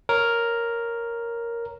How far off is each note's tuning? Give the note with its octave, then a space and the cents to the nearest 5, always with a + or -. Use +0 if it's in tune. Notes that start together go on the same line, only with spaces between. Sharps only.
A#4 +0 C#5 +0